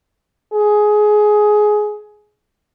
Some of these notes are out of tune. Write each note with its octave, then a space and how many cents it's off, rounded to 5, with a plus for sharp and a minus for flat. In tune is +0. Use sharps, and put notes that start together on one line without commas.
G#4 +15